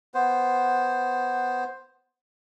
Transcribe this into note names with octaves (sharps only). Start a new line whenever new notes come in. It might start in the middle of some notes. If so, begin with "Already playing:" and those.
B3 C5